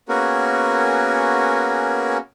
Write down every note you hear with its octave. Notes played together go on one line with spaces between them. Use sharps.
A#3 B3 C#4 F#4 G#4 A#4